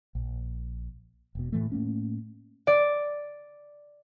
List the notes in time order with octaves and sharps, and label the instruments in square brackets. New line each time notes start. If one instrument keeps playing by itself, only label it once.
[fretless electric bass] A#1
E1 B2
A2 E3 A3
A2 A3 A#3 C#4
[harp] D5